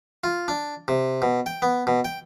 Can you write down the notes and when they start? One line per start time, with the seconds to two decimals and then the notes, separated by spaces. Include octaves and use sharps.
0.24 F4
0.48 D4
0.88 C3
1.22 B2
1.46 G5
1.62 B3
1.87 B2
2.05 G5